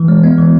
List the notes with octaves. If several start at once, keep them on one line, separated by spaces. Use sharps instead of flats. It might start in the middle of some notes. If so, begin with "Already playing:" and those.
Already playing: E3
G#3
B3
E3